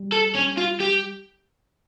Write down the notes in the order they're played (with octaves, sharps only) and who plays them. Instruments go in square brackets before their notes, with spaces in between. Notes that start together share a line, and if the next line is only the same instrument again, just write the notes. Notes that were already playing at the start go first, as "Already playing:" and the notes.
Already playing: [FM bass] G3
[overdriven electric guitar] A4
C#4
F4
G4